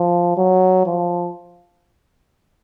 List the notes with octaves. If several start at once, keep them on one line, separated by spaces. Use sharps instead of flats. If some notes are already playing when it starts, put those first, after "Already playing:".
Already playing: F3
F#3
F3